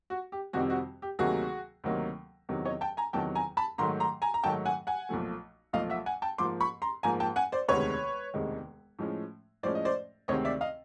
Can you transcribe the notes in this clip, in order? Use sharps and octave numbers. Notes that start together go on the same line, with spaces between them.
F#4
G4
F2 C3 D#3 G3 C4 F#4
F#4
G4
D2 C3 D#3 F#3 A#3 F#4 G#4
D2 C3 D#3 F#3 A#3
E2 C3 D#3 F#3
C#5 D#5
G5 A5
G#5 A#5
E2 C3 D#3 F#3 G5 A5
G#5 A#5
A5 B5
G#2 D#3 F#3 A3 A#5 C6
A#5 C6
G#5 A#5
A#5
G#2 D#3 F#3 A3 G5 A5
F#5 G#5
F#5 G#5
B1 A#2 F3 A3
B1 A#2 F3 A3 D#5 F5
E5 F#5
F#5 G#5
G5 A5
G#2 F3 A#3 C6 D6
B5 C#6
A#5 C6
G#2 F3 A#3 G#5 A#5
G5 A5
F#5 G#5
C5 D5
E1 D2 C3 D#3 G#3 B4 C#5
E1 D2 C3 D#3 G#3
A2 F3 G#3 C#4
A2 F3 G#3 C#4 C5 D5
D#5
C5 D5
D2 C3 D#3 G#3 C4 C#5 D#5
D5 E5
D#5 F5